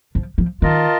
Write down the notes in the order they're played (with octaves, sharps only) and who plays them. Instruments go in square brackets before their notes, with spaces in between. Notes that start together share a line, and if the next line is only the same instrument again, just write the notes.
[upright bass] F3
F3
[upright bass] D#3 [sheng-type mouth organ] F4 A#4 D#5 A5